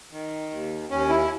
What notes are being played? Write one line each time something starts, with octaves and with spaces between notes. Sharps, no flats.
D#3
D#2
D#2 C#4
E4